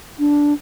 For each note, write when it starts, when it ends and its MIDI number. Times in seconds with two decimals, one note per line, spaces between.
0.19 0.53 62